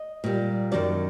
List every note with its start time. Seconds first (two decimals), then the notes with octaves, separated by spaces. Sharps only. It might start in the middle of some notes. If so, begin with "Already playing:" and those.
Already playing: D#5
0.24 A#2 G3
0.72 F#2 D#3 F#3 D5